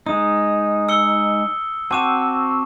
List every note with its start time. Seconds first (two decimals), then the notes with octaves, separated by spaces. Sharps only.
0.06 G#3 D#4 D#6
0.89 E6 C#7 G7
1.91 C4 F#4 A5 D6 E7